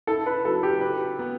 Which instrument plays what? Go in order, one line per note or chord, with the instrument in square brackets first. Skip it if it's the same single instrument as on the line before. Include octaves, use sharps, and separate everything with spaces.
[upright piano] E4 [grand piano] A4
[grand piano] B4
[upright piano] F#3 [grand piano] A4
[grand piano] G4
[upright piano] B4
B3